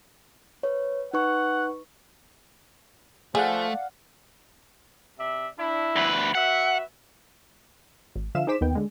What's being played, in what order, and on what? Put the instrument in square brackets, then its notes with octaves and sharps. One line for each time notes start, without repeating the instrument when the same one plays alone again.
[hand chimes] B4 C#5
[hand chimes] D#4 B4 C#6 [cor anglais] F#5
[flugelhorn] F3 [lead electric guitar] A3 [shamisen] G#4 [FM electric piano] D5 F5 F#5
[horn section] C3 D5 E5
D4 E4
[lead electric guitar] D2 B4
[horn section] F#4 B4 E5 [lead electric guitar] F#5
[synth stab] G#1
D3 F3 E5 F5 E7
D#4 G#4 C5 D6 B6 E7
D#2 D#3 B3 G5
D3 G#3